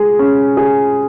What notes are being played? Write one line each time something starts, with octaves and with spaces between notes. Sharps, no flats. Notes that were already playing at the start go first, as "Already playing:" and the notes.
Already playing: G#3 G#4
C#4
G#4